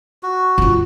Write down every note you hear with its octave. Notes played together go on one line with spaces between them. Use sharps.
F#4
D#4 F4